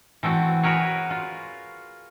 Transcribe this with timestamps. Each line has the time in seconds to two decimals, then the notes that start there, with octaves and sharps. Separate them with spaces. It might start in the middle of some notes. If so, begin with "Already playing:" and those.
0.23 E3 A3 C4 F#4
0.63 F#4 G#4 A#4 B4 C#5
1.10 F4